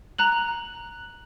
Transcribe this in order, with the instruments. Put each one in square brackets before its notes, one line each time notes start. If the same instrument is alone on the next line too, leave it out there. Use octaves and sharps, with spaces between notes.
[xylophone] A#5 F#6 F#7